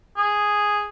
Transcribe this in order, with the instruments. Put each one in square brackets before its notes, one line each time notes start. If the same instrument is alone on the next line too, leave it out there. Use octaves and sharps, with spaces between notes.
[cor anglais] G#4